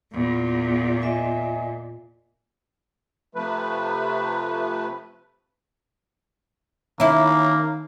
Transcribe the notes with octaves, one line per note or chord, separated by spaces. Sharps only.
E2 A#2
D#5 E5 G#5
C3 F3 A3 B4
D#3 A#3 C#4 E4